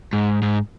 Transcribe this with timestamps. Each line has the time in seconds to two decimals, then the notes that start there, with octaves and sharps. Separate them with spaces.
0.13 G#2
0.42 G#2